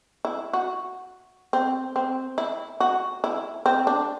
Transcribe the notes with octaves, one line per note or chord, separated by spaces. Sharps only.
E4
F#4
C4
C4
E4
F#4
E4
C4
D4